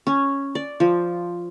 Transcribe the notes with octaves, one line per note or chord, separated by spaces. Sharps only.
C#4
D5
F3